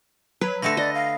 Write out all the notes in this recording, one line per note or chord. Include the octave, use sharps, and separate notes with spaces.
F#3 B4
D3 A3 A4 A#6
D5 D#5
F5